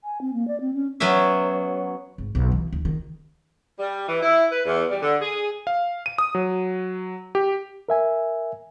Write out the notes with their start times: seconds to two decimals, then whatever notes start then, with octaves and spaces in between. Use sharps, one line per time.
0.04 G#5
0.21 C4
0.34 A#3
0.48 D5
0.61 C4
0.74 C#4
1.00 F#3 B3 C#4 F#4 E5
2.18 G#1
2.35 B1
2.52 E3
2.73 D#2
2.85 D#3
3.79 G3
4.08 E3
4.22 E4
4.51 B4
4.66 E2
4.89 G3
5.02 D3
5.21 G#4
5.67 F5
6.06 D#7
6.18 D#6
6.35 F#3
7.35 G4
7.89 A#4 E5 G#5